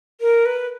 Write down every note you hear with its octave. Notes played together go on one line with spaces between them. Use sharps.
A#4
B4